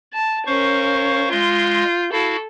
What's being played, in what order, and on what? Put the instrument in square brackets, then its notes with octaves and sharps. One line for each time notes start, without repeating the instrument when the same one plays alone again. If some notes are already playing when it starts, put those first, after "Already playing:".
[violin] A5
[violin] C#4 A#4 [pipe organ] C5 F5 C#6
[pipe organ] G#3 C6 [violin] F4 G6
[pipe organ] E4 F#4 F5 [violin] A4